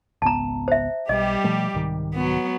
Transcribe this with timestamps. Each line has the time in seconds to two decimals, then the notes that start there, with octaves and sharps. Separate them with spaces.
0.22 G#1 C#2 B3 A5 A#5
0.68 C5 E5
1.09 B1 G3 G4 D#5
1.44 B2 F3 A3
1.74 C2 G#2 D#3
2.14 F#3 B3